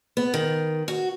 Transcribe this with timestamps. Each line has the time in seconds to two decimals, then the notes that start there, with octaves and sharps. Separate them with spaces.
0.17 B3
0.34 D#3
0.88 F#4